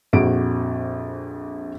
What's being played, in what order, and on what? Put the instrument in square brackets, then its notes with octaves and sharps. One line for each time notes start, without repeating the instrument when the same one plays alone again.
[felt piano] A#1 F2 F#4 D7